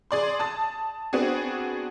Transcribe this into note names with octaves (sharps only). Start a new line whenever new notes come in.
G#4 D5 C6
A5 D#6 A6
B3 C4 D4 F#4 G#4